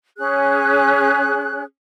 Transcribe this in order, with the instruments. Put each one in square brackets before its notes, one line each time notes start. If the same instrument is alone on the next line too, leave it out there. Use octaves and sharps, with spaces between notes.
[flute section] C#4 G#4 F#6